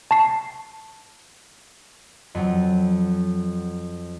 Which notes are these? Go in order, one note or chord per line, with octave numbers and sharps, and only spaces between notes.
A5 C#6 C7
F2 F#3